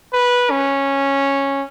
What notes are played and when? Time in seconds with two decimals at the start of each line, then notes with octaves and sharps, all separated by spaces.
0.14 B4
0.51 C#4